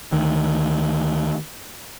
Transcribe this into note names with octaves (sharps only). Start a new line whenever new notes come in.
D2 D#3